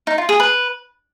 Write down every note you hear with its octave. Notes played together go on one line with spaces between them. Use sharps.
D#4
F4
G#4
B4